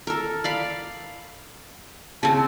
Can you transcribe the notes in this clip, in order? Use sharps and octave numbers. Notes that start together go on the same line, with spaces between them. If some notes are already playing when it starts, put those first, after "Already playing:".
A4 A#4
D5 F5 B5
C#3 C4 A5